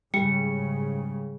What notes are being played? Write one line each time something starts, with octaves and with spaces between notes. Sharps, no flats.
G#2 C#3 G3 C#7